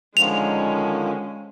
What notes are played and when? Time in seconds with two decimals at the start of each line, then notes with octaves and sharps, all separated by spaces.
0.17 D3 D#3 F3 G#3 C#4 F7